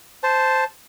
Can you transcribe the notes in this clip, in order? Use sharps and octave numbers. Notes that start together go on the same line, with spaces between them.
C5 A5